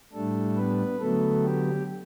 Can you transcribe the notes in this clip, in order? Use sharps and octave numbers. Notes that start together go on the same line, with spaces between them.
A2 G3 A3 D4 A4
B3 B4
D3 F#3 A3 B3 A4
G4